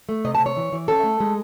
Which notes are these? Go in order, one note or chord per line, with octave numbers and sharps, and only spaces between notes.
A3
C3 D#5
A5
C3
C#5
E3
E3
C#4 A4
A3
G#3